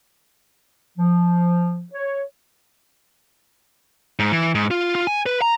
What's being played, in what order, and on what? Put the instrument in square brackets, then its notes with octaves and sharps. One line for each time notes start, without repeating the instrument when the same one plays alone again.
[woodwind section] F3
C#5
[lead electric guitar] G#2
E3
G#2
F4
F4
G#5
B4
A#5